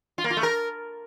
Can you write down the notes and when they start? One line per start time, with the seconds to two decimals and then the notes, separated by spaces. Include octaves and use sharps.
0.18 F4
0.24 A#3
0.31 F4
0.37 A3
0.43 A#4